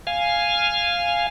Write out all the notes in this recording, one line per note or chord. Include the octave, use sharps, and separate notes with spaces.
F5 G#5